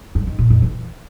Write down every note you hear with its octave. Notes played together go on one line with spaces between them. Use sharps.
G2
D#3
A#2
F2
E3